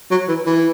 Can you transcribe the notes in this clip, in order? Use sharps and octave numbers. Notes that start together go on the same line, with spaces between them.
F#3
E3
E3